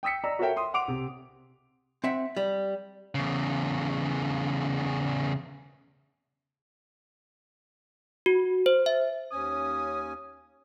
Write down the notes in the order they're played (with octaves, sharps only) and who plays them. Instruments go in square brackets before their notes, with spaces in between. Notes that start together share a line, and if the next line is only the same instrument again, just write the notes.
[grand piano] G5 D#6 E6 B6 C#7
D5 D#5 A#5 E6
F#4 A4 A#4 C#5 E5 G5
C6 D#6
F#5 C6 D6 D7 F7
C3
[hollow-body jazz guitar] C4 E5 F#5
G3
[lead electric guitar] E2 C#3
[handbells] F#4
C5
E5
[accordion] D#2 C#4 G#5 [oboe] D#6